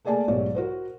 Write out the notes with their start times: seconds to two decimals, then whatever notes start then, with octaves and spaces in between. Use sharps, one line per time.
0.05 A3 A#3 G#4 D5 G#5 A5
0.28 B1 G#2 G4 C#5 D5
0.55 F#4 A#4 C5